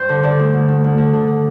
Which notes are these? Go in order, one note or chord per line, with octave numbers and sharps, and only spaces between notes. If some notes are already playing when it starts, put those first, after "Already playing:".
Already playing: G2 C5
D3
D3 D5
D2
D2
D2
D2
D3
D3
D3